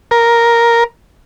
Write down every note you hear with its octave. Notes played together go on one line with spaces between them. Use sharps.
A#4